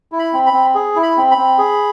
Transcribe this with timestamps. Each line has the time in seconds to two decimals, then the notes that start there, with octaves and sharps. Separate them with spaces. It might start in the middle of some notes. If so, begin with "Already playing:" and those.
0.12 E4
0.19 B5
0.33 C4
0.46 B5
0.53 C4
0.75 G#4
0.96 E4
1.03 B5
1.17 C4
1.31 B5
1.38 C4
1.58 G#4